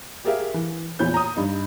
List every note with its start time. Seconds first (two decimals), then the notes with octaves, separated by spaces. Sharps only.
0.25 G4 G#4 A#4 E5 F5
0.54 E3
0.99 E2 A#2 E4 C#5 G6
1.14 A#5 D#6
1.36 G2 D#4